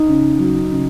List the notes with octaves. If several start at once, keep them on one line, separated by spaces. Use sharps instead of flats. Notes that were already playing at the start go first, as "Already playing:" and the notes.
Already playing: D#4
C#3
F#3
C#3